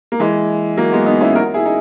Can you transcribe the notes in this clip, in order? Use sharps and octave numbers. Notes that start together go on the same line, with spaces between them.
A#3
E3 G#3
F#3 A#3
G#3 B3
B3 D#4
C#4 E4
F#4 A#4
E4 G#4
D#4